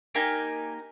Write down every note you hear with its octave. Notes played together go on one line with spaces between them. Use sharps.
A#3 D#4 G4 G#5